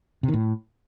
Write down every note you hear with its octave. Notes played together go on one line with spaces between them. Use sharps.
C3
D#3
A2